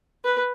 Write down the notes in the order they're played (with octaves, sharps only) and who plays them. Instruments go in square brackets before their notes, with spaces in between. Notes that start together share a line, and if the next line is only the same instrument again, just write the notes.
[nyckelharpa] B4